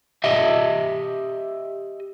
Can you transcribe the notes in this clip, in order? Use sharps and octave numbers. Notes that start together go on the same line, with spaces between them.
G4 D#5 E5